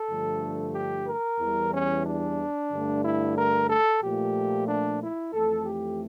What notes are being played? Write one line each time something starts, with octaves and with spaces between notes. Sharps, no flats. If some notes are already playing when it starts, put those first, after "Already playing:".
Already playing: A4
G2 D3 F3 A3
G4
A#4
E2 E3 G3
C#4
D4
G2 D3 A3
E4
A#4
A4
A#2 F3 A3 G4
D4
E4
F2 E3 A3 A4
G4